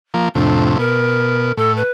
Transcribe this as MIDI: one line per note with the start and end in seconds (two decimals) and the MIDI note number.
0.14 0.29 53
0.14 0.29 58
0.35 0.78 41
0.35 0.78 45
0.35 0.78 48
0.35 0.76 62
0.79 1.52 47
0.79 1.52 70
1.57 1.83 45
1.57 1.73 69
1.77 1.92 71